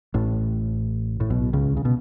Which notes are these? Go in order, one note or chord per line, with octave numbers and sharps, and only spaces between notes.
A1 A2
A2
B1 B2
C#2 C#3
C#3
B2